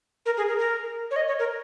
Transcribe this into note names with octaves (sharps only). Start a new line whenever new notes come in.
A#4
G#4
A#4
A#4
C#5
D#5
C#5
A#4